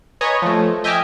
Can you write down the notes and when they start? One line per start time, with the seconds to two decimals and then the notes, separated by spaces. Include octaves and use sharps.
0.21 B4 C#5 D#5 G#5 A#5
0.42 F3 A3
0.84 D#5 E5 G5 G#5 D6 F6